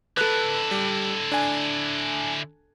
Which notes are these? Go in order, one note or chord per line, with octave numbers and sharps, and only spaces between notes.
D3 E4 A4 B4 F#6
G3
D4 G#5